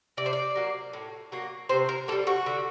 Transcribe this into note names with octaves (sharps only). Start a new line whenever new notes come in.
C3 D5
C5
D5
F#3 A#3
A2
F#3 A#3
C3 C5
A#4
A#3 A4
G3
F#4
D3